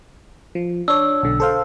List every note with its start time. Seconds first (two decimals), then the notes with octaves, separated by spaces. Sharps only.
0.55 F3
0.88 D4 C#5 E6
1.23 B1 D3
1.40 A4 C5 F5